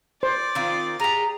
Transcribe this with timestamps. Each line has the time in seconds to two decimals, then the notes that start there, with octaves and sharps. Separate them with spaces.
0.23 C5 D5
0.55 D#3 C4 F4
1.00 G4 G#4 A#5